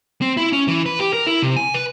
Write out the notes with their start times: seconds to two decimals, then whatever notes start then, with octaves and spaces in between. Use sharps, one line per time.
0.22 C4
0.37 E4
0.52 C#4
0.68 E3
0.86 B4
1.00 G4
1.13 A#4
1.27 E4
1.42 C3
1.56 G#5
1.74 B4